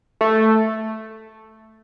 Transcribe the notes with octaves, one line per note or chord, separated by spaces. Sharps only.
A3